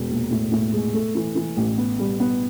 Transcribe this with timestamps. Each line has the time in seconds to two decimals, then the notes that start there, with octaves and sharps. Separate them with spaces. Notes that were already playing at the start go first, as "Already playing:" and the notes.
Already playing: E1
0.10 A#1
0.31 A2
0.52 A2
0.72 G#3
0.94 A3
1.15 E3
1.35 E3
1.57 A1
1.78 B3
1.99 G3
2.20 B3